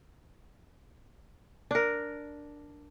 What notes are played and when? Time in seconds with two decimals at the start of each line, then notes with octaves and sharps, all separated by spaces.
1.71 D4 A#4